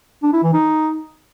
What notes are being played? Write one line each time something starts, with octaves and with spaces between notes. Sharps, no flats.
D4
E4
E3
D#4